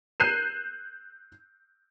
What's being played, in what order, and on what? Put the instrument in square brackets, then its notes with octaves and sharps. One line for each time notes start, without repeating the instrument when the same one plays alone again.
[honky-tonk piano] F#6 G6 C7 D#7 E7